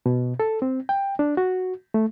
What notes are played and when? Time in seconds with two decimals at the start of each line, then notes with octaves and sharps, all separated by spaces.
0.06 B2
0.40 A4
0.62 C4
0.89 G5
1.19 D4
1.37 F#4
1.94 A3